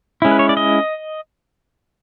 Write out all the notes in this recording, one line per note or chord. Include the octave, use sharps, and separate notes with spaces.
G#3 C#4 E4
B4
C#5
D5
D#5